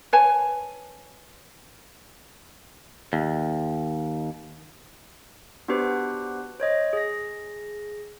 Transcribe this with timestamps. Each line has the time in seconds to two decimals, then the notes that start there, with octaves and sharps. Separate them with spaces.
0.13 B4 C#5 G#5 A5
3.13 D#2
5.68 B3 D4 F#4 G4 B4 C5
6.60 C5 C#5 D#5
6.93 G#4 A#6